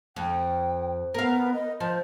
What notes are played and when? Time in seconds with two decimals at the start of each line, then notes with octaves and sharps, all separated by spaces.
0.16 F2 G5
1.14 B3 A#4 F5
1.54 D#5
1.80 F3 C5